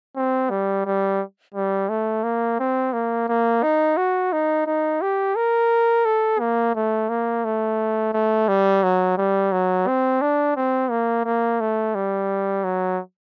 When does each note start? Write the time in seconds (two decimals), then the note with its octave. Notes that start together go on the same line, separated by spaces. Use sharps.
0.17 C4
0.50 G3
0.86 G3
1.54 G3
1.89 A3
2.24 A#3
2.60 C4
2.93 A#3
3.28 A#3
3.63 D#4
3.97 F#4
4.33 D#4
4.67 D#4
5.02 G4
5.36 A#4
6.05 A4
6.40 A#3
6.75 A3
7.09 A#3
7.45 A3
8.14 A3
8.48 G3
8.84 F#3
9.18 G3
9.52 F#3
9.88 C4
10.22 D4
10.57 C4
10.91 A#3
11.25 A#3
11.61 A3
11.95 G3
12.64 F#3